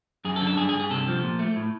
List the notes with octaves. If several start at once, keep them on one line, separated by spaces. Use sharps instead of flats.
F#2 G#4
A4
D3
A4
G2 G#4
G#4
G2
G#4
C3 A4
F3
A#2
A3
A2